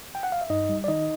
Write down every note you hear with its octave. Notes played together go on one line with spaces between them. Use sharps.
G5
F#5
F5
E5
G2 D#4 D#5
G3
D5
D#3 D#4 D#5